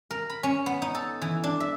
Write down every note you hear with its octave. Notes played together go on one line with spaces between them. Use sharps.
A#4
B5
C#4
B3
D#4
A4
E3
D4
E5